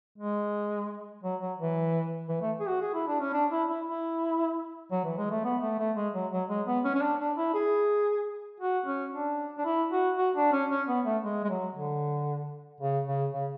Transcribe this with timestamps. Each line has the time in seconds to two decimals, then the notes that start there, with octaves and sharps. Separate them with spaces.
0.18 G#3
1.23 F#3
1.41 F#3
1.58 E3
2.29 E3
2.41 A3
2.60 G#4
2.68 F#4
2.81 G#4
2.94 E4
3.07 D4
3.21 C#4
3.33 D4
3.51 E4
3.69 E4
3.86 E4
4.91 F#3
5.04 E3
5.18 G#3
5.31 A3
5.44 B3
5.62 A3
5.79 A3
5.96 G#3
6.14 F#3
6.32 F#3
6.49 G#3
6.67 B3
6.84 C#4
6.95 C#4
7.02 D4
7.20 D4
7.37 E4
7.54 G#4
8.60 F#4
8.86 C#4
9.12 D4
9.58 D4
9.65 E4
9.92 F#4
10.18 F#4
10.36 D4
10.52 C#4
10.70 C#4
10.88 B3
11.05 A3
11.23 G#3
11.44 G#3
11.49 F#3
11.75 D3
12.80 C#3
13.07 C#3
13.33 C#3